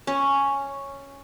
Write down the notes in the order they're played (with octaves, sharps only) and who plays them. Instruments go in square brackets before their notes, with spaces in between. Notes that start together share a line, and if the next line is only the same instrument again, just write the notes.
[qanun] C#4